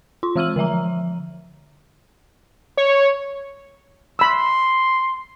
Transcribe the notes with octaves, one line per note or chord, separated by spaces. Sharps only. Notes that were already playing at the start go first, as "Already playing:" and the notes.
F4 C6
E3 G#3 E6 F6 D#7 F#7
D3 F3 E5 A#5
C#5
B5 C6 E6